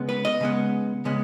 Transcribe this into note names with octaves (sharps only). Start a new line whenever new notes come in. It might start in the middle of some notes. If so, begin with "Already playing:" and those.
Already playing: C#3 G#3 B3
B4
D#5
C#3 G#3 B3
C#3 G#3 B3